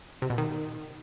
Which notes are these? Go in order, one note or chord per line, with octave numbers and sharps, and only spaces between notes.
C3
B2
D#3